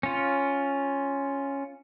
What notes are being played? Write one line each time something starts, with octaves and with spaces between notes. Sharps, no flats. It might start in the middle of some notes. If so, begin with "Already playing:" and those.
C#4 F4